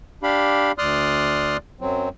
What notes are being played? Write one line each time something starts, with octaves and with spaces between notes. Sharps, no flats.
D4 G4 F5 B5
D2 D5 C6 D#6 F6 F#6
F#2 F#3 C4